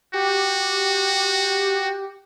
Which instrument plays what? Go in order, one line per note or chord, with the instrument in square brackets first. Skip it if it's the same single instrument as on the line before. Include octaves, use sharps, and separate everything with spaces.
[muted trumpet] F#4 [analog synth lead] G4